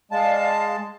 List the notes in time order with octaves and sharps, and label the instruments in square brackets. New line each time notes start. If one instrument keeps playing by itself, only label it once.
[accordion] G#3 A5 [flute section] D5 F5